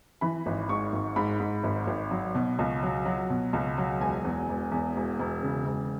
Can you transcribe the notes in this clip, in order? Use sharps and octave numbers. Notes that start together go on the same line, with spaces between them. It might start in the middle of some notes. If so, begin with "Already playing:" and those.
E3 B5
G#1
G#2 C#6
G#1
G#2 B5
G#2
G#1
G#1
F#3
B2
C#2
F#3
F#3
B2
C#2
F#3
E1 G#5
E2
E1
E2
E1
E1
C#3
E1